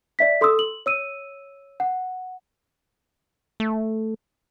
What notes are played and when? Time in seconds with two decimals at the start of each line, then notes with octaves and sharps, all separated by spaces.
0.19 D5 E5 B6
0.41 A4 C6 D#6 E6
0.59 F#7
0.86 C#5 E6 D#7
1.80 F#5
3.60 A3